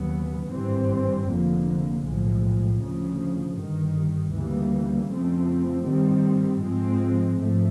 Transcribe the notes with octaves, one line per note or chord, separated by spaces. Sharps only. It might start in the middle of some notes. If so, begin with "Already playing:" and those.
Already playing: D#2 C#3 F#3 B3
G#1 G2 E3 G3 C4
F1 F2 D3 F3 A#3
B1 A2 F3 G#3
D2 C#3 F3
G1 G2 D#3
D2 C#3 E3 G3 A#3
F2 C#3 F3 A3 C4
G2 D#3 G3 C4
G#2 F3 G#3 C4
G#2 F3 A3